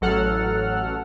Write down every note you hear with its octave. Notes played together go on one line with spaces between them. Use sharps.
A1 F#3 A4 F#5 F6